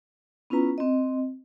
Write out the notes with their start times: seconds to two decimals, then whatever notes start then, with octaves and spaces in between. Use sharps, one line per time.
0.50 B3 C#4 E4 F4 B4 A#5
0.78 C4 D#5